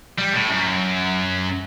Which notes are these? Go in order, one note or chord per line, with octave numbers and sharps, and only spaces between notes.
G3
A2
F#2